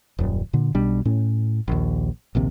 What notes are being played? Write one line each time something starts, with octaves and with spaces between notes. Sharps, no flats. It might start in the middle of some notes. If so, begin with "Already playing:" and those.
D#1 F#2
A#2 D3
B1 B2 G3 D4
A2 C#4
A#1 D#2
A#1 D#2 C3